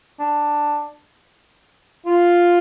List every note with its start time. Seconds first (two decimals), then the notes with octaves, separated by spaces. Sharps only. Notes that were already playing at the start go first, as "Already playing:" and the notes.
0.20 D4
2.06 F4